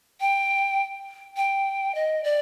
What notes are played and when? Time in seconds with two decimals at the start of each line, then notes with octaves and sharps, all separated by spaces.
0.21 G5
1.37 G5
1.95 D#5
2.24 D5